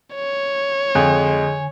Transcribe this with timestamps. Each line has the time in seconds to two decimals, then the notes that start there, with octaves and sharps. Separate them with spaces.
0.15 C#5
0.95 F2 D3 G#3 G#5